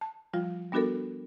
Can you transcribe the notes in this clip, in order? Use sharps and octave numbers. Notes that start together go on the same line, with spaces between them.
A5
F3 G3 F4
G3 B3 D4 F#4 A4 A#4